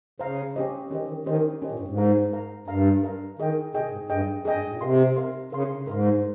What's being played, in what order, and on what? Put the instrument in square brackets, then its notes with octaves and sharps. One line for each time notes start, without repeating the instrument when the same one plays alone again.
[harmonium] C#3 [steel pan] C5 F5 A#5
[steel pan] C#4 G4 C5 D#5
[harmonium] D#3 [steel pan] C#4 G4 C5 D#5
[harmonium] D#3
[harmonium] D#3 [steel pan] C#4 G4 C5 D#5
[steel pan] C#4 G4 C5 D#5
[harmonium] A#2
G2
G#2
[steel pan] A#4 F5 A#5
A#4 F5 A#5
[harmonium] G2 [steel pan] A#4 F5 A#5
[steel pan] A#4 F5 A#5
[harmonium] D#3 [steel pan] G#4 D#5 G5
[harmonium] C3 [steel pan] G#4 D#5 G5
[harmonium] G#2
[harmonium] G2 [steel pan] G#4 D#5 G5
[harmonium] F2 [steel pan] G#4 D#5 G5
[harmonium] G2
G#2
A#2
[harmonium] C3 [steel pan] A#4 F5 C6
[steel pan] A#4 F5 C6
[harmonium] C#3 [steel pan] A#4 F5 C6
[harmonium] G#2 [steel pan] A#4 F5 C6